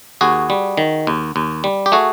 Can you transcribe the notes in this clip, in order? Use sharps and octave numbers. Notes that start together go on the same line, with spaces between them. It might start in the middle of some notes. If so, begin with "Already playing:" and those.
D#2 F#4 G#4
G3
D#3
D#2
D#2
G3
G4
A3 F#4 G#4